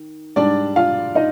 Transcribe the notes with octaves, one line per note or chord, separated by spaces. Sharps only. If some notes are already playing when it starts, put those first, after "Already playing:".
Already playing: D#3
G#2 G3 D4 D5
F4 F5
D#4 D#5